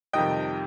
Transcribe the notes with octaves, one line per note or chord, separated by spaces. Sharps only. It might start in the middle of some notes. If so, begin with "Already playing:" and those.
F2 C3 D#3 G3 D#5 G5